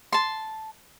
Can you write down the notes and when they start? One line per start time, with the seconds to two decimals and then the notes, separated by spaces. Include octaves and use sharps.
0.12 A5 C6